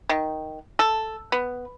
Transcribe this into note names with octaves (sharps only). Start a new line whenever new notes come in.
D#3
A4
B3